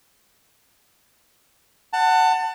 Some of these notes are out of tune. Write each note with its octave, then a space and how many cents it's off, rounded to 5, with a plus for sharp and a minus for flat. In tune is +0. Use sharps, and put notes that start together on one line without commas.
F#5 +5 A5 +25